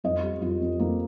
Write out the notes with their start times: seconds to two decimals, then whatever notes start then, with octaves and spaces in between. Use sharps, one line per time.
0.04 F2 D#5
0.22 G3
0.41 F2 F4
0.61 F2
0.79 F2 A#3